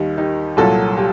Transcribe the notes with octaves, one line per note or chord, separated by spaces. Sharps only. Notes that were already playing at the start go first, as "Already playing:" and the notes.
Already playing: D#2 D#3 G3 D#4
D#4 G4
C2 A#2 F#3 F#4 A4
G4